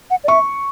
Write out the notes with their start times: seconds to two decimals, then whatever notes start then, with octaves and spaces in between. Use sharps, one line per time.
0.10 F#5
0.24 D5
0.28 E5 C#6